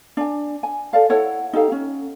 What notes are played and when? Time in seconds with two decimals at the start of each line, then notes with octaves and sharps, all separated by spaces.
0.17 D4 G#5
0.63 G#5
0.93 A4 D5 F5
1.10 E4 A4 C#5 F#5
1.53 D#4 G4 A4 F5
1.72 C#4